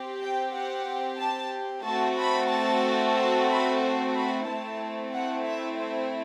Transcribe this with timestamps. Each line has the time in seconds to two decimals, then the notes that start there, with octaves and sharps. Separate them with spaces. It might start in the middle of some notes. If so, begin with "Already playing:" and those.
Already playing: C4 G4
0.20 G5
0.53 F#5
1.18 A5
1.84 A3 C4 F#4 A4 A5
2.18 B5
2.50 A5
3.16 A5
3.49 B5
3.81 C5
4.15 B5
4.47 A3 C4 E4 A5
5.13 F#5
5.46 E5
5.79 C5